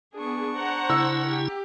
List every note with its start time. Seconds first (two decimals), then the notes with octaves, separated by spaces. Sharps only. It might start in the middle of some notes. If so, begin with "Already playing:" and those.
0.15 B3 D4 G#4 C#6
0.56 C5 F#5 A#5
0.90 C#3 E4 E6
1.29 G4